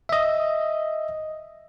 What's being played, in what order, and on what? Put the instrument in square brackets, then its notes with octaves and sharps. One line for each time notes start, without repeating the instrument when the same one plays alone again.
[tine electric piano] D#5 E5